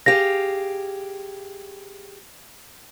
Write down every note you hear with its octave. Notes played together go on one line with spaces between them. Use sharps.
G4 G#4 F5 A#6